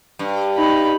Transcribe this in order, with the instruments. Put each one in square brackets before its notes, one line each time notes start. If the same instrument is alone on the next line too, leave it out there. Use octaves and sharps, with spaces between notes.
[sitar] G2
[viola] D#4 B5